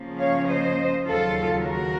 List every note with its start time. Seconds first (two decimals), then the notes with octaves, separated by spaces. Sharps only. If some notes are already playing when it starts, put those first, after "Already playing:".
Already playing: C#3 F3 A#3 C#4
0.19 C#5 F5
0.48 C5 D#5
1.05 D#2 C#3 F#3 F4 A4
1.62 F#4 A#4